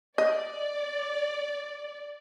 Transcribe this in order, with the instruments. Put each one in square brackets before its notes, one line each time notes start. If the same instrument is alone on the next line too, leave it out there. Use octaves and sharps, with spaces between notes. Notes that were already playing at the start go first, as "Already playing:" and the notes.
[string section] D5 [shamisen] D#5